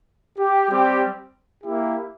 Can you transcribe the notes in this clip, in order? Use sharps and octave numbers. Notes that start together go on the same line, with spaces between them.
G4
G3 C4 G4
A#3 E4 G4